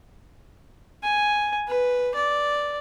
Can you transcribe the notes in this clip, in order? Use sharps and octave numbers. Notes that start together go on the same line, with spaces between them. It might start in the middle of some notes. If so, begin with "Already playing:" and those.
G#5
B4
D5